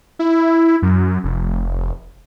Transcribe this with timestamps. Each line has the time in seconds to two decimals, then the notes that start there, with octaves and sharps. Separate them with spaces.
0.19 E4
0.82 F#2
1.24 F1